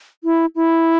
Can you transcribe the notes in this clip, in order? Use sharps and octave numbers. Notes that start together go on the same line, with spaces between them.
E4
E4